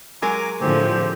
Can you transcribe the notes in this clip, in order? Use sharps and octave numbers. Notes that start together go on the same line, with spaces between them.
F#3 G#3 A#4 G#5 A#5 D6
A2 D3 F3 C4 G4 C5